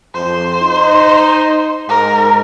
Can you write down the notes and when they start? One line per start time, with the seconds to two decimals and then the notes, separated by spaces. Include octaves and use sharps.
0.14 F2 C5
0.62 D#4
1.89 G#2 A#4